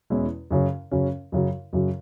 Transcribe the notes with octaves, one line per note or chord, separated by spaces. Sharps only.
E2 B2 G#3 C#4 E4
F#2 C#3 F#3 C#4
F#2 C#3 F#3 C#4
F#2 C#3 F#3
F#2 C#3 F#3